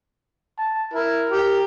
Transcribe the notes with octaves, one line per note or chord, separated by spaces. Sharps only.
A5
E4 A#4
G4